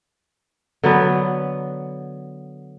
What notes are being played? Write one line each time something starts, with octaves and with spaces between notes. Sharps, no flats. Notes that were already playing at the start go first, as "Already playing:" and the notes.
D3 F#3 B3 B4